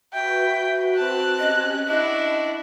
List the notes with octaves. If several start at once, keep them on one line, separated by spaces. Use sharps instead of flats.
F#4 B4 E5 G5
C4 A5 F#6
C#4 G4 D#5 G#5
D4 E4 D#5 F#5 B5 C#6